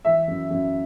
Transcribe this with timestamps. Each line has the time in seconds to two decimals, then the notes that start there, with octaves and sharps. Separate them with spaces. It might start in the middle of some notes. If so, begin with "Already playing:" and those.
0.05 E3 E5
0.28 F#2
0.50 F#2